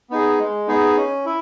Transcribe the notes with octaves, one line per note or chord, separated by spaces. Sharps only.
B3 D#4 G#4
G#3
B3 D#4 G#4
C#4
E4